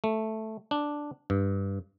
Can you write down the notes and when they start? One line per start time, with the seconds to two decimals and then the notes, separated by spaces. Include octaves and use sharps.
0.04 A3
0.71 D4
1.30 G2